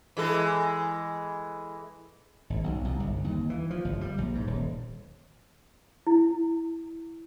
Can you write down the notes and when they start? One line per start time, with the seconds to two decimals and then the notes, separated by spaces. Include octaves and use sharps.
0.17 E3 G#3 A4
2.50 G#1
2.64 B1
2.85 C2
3.00 G1
3.24 D#2
3.50 E3
3.70 F3
3.85 G1
4.01 G3
4.18 A#1
4.35 G#2
4.47 D#1
6.07 E4